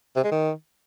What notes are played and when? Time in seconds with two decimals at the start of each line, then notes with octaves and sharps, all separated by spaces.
0.16 C3
0.24 G#3
0.32 D#3